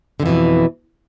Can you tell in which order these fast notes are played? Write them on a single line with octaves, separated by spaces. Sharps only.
D3 F2 E3 B2